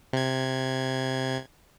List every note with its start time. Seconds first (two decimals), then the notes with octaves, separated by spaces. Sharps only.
0.13 C3 G#6